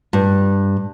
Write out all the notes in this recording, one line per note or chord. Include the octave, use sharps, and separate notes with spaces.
G2